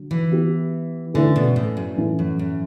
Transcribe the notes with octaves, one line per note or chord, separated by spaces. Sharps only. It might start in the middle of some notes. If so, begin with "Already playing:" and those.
Already playing: D3 F#3
E3
B3 E4 G4
D3 A3 C#4 E4 B4 D5
B2
A2
F#2
A2 E3 A3 C#4
F#2
F#2